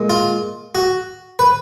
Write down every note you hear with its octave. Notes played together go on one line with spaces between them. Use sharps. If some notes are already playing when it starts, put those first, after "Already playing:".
Already playing: A#2 G#3
F4
F#4
B4